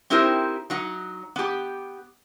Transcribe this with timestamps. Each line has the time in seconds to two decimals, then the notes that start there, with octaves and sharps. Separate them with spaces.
0.10 C4 D#4 E4 G4 A#4 C5
0.70 F#3 D#4 F#5
1.36 B3 G4